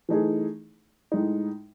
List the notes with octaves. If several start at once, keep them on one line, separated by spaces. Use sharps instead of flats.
E3 A3 D#4 G#4
A2 G#3 D#4